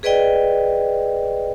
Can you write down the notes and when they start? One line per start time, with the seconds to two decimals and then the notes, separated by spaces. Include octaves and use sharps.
0.03 G#4 B4 D5 D#5 G5